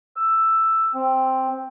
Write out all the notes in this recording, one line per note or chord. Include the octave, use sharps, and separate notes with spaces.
E6
C4